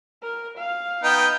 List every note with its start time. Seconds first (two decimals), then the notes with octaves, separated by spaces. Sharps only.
0.23 A#4
0.57 F5
1.04 B3 D#4 G5